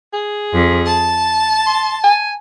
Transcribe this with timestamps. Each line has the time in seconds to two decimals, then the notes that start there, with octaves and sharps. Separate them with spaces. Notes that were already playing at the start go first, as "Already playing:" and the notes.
0.13 G#4
0.53 F2
0.88 A5
1.66 C6
2.04 G#5